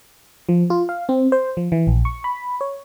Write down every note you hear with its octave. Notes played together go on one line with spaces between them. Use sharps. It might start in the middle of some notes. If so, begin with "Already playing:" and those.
F3
F4
F5
C4
C5
F3
E3
A#1
C#6
B5
C#5